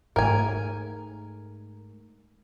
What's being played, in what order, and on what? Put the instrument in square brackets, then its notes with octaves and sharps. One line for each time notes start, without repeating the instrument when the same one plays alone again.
[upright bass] G#2 A3 [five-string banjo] A#4 G#5